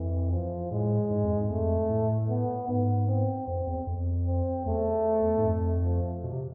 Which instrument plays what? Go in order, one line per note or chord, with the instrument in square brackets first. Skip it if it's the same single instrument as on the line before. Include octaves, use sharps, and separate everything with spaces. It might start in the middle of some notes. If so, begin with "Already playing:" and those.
Already playing: [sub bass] F2 [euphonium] E3
[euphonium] F3
[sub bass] A2 [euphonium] G#3
[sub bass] G#2
F2
G#2
[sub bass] F2 [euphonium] A3
[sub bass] A2
[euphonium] B3
[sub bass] G#2 [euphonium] B3
[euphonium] C4
[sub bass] F2 [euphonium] C4
[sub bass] E2
F2
[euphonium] C4
[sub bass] E2 [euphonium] A3
[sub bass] G#2
F2
[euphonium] F3
[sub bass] B2
C3